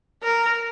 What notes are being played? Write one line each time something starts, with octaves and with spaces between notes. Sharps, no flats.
A#4